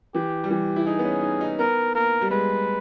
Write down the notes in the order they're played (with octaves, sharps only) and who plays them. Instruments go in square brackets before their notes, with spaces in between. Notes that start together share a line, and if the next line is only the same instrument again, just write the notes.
[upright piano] E3 [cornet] G4
[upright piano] G3
[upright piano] E3 [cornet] G4
[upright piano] E4
[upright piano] D#4 [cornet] G#4
[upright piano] B3
C#4
D#4
D#4
[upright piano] B3 [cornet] A#4
[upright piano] A#3 [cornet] A#4
[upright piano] G3
[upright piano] G#3 [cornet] B4